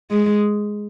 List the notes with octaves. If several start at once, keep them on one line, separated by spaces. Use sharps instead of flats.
G#3